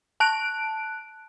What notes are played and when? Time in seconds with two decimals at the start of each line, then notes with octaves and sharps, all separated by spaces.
0.20 A5 F#6 D7